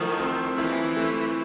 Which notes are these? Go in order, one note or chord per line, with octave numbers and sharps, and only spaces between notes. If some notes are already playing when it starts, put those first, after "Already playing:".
Already playing: D#3 F3 A3 E4
C4
E3 E4
A3